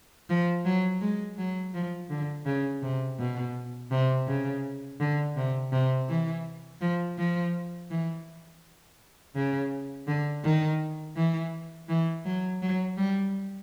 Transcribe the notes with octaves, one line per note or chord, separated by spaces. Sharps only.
F3
F#3
G#3
F#3
F3
D3
C#3
C3
B2
C3
C#3
D3
C3
C3
E3
F3
F3
E3
C#3
D3
D#3
E3
E3
F#3
F#3
G3